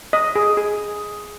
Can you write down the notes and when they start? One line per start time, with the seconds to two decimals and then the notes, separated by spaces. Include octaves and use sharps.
0.13 D#5
0.36 G#4
0.57 G#4